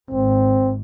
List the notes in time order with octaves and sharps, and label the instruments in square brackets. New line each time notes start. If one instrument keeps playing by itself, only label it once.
[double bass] G#1 [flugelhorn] C4